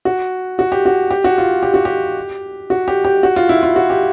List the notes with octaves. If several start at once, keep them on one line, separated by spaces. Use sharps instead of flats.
F#4
F#4
G4
F#4
G4
F#4
F4
G4
F#4
G4
F#4
G4
G4
F#4
F4
E4
F4
F#4
G4